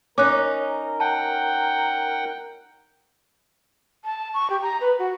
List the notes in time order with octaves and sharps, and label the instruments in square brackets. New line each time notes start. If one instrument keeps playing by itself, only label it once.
[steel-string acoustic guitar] C#4 D#4 [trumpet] A#4 [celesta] D6 F#6
[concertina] F#5 G5 [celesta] A5
[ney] A5
C#6
G4
A#5
B4
F#4